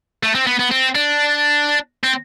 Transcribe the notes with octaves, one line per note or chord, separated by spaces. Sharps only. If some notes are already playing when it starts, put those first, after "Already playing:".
A3
C4
B3
B3
C4
D4
C4